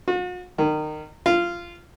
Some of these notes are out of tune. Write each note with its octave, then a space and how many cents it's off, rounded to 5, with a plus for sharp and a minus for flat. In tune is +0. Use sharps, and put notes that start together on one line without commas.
F#4 -45
D#3 -25
F4 -15